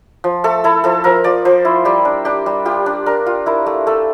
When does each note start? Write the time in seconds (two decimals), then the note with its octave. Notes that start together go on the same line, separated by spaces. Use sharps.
0.24 F3
0.44 A3 A4
0.64 E4 A4
0.84 F3 A4
1.04 F3 A#4
1.24 F3 D5
1.45 F3 C5
1.65 E4
1.85 G3 G4
2.05 D4
2.25 D4 G4
2.46 G3
2.65 F4 G4
2.86 D4
3.06 D4 A#4
3.26 F4
3.46 E4 A#4
3.66 A3
3.87 A3 A4